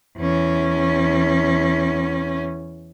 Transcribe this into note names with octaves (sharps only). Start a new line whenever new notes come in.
E2 C#4